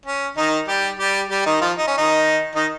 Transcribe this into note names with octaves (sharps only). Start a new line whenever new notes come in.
C#4
D#3 D#4
G3 G4
G3 G4
G3 G4
D#3 D#4
F3 F4
D#4
C#4
D#3 D#4
D#3 D#4